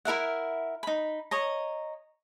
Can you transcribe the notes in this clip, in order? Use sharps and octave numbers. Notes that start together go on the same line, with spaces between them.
E4 A#4 E5 F#5
D#4 B5
C#5 D#5 A#5